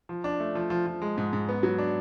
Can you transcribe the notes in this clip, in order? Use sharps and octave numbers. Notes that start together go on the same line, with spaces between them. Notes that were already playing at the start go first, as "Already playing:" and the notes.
F3
D4
A3
F3
F3
F3
G#3
G#2
G#2
B3
F#3
D4